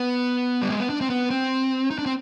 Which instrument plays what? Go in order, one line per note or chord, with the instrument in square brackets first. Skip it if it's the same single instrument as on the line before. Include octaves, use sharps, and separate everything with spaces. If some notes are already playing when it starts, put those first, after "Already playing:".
Already playing: [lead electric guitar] B3
G3
G#3
B3
D4
C4
B3
C4
D#4
D4
C4